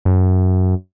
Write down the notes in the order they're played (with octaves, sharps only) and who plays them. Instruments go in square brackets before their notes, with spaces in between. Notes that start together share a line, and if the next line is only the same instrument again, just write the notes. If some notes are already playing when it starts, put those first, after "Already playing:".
[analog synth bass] F#2